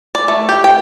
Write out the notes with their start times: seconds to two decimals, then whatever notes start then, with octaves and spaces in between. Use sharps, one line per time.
0.15 D5
0.28 A3
0.49 G4
0.64 G5